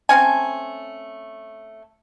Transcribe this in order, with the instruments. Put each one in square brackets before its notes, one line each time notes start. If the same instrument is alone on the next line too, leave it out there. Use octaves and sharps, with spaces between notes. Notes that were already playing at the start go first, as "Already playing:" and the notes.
[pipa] A3 C4 C#4 G#5